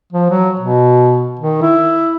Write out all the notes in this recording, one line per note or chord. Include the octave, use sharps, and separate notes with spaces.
F3
F#3
B2
D#3
E4